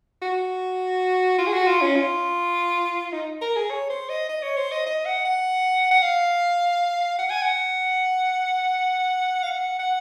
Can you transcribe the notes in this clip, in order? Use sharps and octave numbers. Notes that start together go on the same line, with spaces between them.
F#4
F4
G#4
F#4
F4
C#4
F4
D#4
A#4
G#4
C#5
C5
D#5
D#5
C#5
C5
D#5
D#5
F#5
F#5
F#5
F5
F#5
G#5
F#5
F5
F#5
F#5